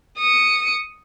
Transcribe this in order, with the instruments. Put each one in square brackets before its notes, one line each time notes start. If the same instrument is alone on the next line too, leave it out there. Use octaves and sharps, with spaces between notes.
[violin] D#6 C#7